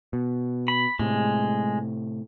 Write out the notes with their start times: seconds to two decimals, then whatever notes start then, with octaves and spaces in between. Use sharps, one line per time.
0.13 B2
0.68 B5
0.99 A2 C3 G#3